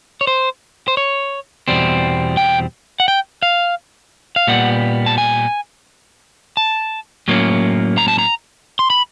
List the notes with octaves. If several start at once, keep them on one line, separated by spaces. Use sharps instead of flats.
C#5
C5
C5
C#5
E2 B2 G3 C4
G5
F#5
G5
F5
F5
A#2 G3 B3 F#5
A5
G#5
A5
A2 F#3 A#3 C#4
A#5
A5
A#5
C6
B5